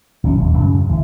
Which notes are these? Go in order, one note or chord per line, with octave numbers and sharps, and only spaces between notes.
G#1 F#3 C#4
D#1
F#2 C#3
G#1 E3